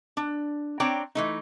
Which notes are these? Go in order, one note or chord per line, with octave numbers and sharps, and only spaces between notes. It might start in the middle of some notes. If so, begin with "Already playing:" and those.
D4
C4 D4 C#5 D5 G5 A#5
E3 A3 D#4